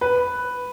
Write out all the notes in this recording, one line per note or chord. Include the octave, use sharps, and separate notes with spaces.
B4